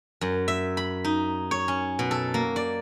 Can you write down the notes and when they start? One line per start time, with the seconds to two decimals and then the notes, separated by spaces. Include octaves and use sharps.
0.21 F#2
0.48 E5
0.77 B5
1.04 D#4
1.51 C#5
1.68 C#4
1.99 B2
2.11 A4
2.34 A#3
2.56 D5